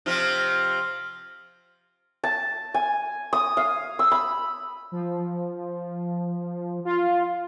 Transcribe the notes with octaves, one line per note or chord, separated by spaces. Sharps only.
C3 F3 F4
A5
G#5
D#6
F5
E6
B5
F3
F4